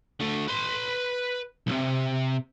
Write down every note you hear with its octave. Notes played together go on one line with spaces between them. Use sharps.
D3 A3
B4 C6
B1 C3